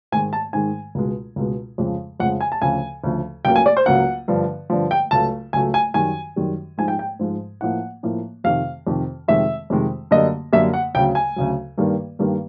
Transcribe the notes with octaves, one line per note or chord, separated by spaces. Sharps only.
G#2 D#3 G#3 G#5
A5
G#2 D#3 G#3 G#5
C#2 B2 G#3
C#2 B2 G#3
F2 C#3 F3 G#3
F2 C#3 F3 G#3 F#5
G#5
A5
D2 C#3 F3 G#5
D2 C#3 F3
C#2 C#3 F#3 A#3 G5
G#5
D5
C5
C#2 C#3 F#3 A#3 F#5
G2 D3 F3
G2 D3 F3
G5
C#2 C#3 F#3 A3 A5
C#2 C#3 F#3 A3 G#5
G#5
F#2 D#3 G3 G#5
F#2 D#3 G3
G#2 F3 G#3 G#5
G5
G5
G#2 F3 G#3
A2 F3 A#3 F#5
A2 F3 A#3
F2 C3 D#3 F5
F2 C3 D#3
F2 C3 D#3 G#3 E5
F2 C3 D#3 G#3
F#2 D3 G3 A#3 D#5
F#2 D3 G3 A#3 E5
F#5
D2 C#3 F#3 G5
G#5
D2 C#3 F#3
G2 D#3 G3 A#3
G2 D#3 G3 A#3